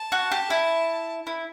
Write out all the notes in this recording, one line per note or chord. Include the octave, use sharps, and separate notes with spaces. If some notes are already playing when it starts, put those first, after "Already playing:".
Already playing: A5
F#4
G4
E4
E4